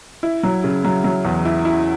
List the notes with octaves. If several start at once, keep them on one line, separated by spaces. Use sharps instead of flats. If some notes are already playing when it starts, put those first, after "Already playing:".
E4
F#3
C#3
F#3
F#3
E2
E4
E4